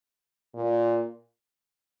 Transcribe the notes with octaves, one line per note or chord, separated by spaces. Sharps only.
A#2